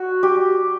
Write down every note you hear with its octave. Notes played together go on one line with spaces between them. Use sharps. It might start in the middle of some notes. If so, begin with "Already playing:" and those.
Already playing: F#4
G4